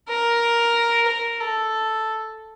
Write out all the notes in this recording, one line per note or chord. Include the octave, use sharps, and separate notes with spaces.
A#4
A#4
A4